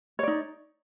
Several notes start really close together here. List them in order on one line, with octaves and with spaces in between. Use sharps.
C#5 D5 D#4